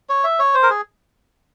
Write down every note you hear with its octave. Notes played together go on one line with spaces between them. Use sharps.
C#5
E5
C#5
C5
A#4
G#4